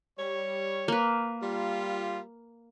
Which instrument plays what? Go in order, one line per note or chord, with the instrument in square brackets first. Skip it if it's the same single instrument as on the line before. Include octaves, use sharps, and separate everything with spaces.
[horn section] G3 C#5
[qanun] A#3 B4
[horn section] G3 F4